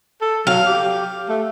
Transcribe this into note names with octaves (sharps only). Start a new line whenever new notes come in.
A4
F#3 F5
G4
A3